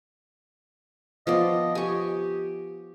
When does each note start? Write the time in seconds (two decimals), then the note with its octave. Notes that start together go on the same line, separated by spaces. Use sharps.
1.27 F3 B3 D5 D#5
1.75 G4 G#5 C#6